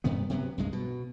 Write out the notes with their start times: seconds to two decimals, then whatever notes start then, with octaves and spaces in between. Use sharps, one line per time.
0.04 G2 C3 D#3 B3
0.30 C3 F#3 A#3 B3
0.58 C2 G2 G#3
0.73 B2